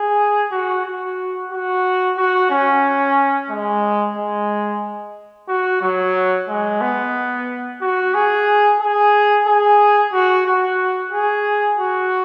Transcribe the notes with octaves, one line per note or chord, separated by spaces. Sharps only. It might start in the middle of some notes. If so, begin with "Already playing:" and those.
Already playing: G#4
F#4
F#4
F#4
F#4
C#4
G#3
G#3
F#4
F#3
G#3
B3
F#4
G#4
G#4
G#4
F#4
F#4
G#4
F#4